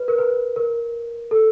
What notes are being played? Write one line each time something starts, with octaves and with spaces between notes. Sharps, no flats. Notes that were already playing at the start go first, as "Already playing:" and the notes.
Already playing: B4
A#4
B4
A#4
A4